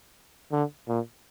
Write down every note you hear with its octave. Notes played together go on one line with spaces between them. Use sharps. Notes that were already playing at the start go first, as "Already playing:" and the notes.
D3
A#2